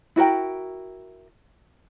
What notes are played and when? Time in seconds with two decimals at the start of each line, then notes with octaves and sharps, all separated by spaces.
0.16 E4 F#4 A#4 G5